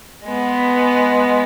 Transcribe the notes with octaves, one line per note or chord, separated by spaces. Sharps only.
G#3 B3